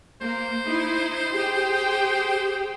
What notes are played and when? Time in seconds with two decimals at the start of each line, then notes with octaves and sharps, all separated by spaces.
0.21 A#3 C5
0.67 D#4 E4
1.33 G4 G#4 G5